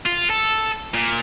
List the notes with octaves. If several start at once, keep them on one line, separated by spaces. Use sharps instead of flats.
F4
A4
A#2